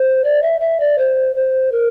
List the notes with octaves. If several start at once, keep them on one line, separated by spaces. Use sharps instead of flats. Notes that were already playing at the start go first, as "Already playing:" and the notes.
Already playing: C5
D5
E5
E5
D5
C5
C5
A#4